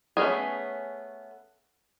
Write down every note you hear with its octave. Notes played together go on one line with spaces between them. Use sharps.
A3 B3 C#4 D#4 G#4